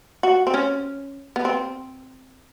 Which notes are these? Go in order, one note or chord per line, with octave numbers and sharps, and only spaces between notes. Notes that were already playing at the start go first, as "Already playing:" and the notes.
F#4
C4
C#4
B3
C4